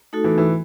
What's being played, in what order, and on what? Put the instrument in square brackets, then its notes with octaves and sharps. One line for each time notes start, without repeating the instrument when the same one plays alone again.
[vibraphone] A3 D#4 F#4 A4
[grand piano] E3
E3